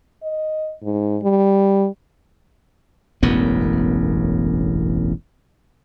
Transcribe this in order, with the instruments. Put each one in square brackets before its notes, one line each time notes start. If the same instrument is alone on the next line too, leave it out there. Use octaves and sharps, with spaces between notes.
[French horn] D#5
G#2
G3
[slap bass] E1 A1 F#2 B3